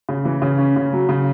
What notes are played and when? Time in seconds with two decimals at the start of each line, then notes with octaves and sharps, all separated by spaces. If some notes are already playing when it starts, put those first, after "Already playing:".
0.09 C#3
0.25 E3
0.42 C#3
0.59 C#4
0.76 C#3
0.93 F#3
1.09 C#3